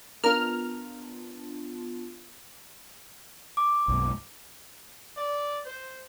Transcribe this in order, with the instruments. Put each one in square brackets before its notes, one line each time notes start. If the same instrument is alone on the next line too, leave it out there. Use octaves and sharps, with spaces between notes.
[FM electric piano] B3 D4 F4 [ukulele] A#4 [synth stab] F6
[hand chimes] D6
[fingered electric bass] B1 F#2 G#3
[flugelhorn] D5
C5